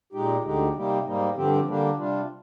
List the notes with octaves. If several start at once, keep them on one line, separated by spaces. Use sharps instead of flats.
A#2 G#3 D#4 G4
D2 D3 G#3 D#4 G4
C3 G3 A#3 D#4 G4
G#2 G3 A#3 D#4
G2 D3 F3 C4 G4
D3 G3 A#3 D4 G4
C3 G3 D4 F4